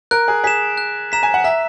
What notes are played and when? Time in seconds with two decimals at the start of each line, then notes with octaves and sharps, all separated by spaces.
0.11 A#4 F#6
0.28 G#4
0.44 G#4 B6 E7
0.78 F#6
1.12 A#5 B6 E7
1.23 G#5
1.34 F#5
1.44 E5 A#5